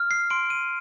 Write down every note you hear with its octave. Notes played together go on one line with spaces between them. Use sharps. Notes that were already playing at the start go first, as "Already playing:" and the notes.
Already playing: F6
C7
C6 D7
D#7